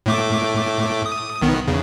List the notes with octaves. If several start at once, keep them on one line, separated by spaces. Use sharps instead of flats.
A2 A3 D6
D#6
B1 D#3 B3
E2 C#3